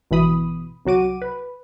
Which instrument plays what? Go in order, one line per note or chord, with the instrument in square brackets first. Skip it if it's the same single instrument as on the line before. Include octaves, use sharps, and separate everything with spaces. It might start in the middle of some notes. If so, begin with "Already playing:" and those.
[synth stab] G#1 B2 E3 B5 D#6
C2 F#3 F#4 D6 D#7
B4